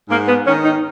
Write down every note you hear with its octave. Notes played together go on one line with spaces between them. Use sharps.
G#2 A#3
B3
D#3 C#4
D#4